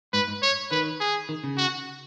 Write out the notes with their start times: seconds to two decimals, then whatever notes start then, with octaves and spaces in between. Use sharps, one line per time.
0.13 G#2 B4
0.28 G#2
0.43 C#5
0.71 D#3 B4
1.00 G#4
1.29 D#3
1.44 C#3
1.58 F#4